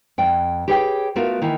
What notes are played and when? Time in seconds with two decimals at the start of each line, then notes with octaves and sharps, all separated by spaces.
0.18 F2 G5
0.68 G4 G#4 B4 C#5 F5 G5
1.16 A3 B3 F4 F#4 A#4 F5
1.42 D#3 E3 A#3 E4